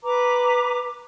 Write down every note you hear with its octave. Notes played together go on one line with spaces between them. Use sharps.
B4 A#5 D6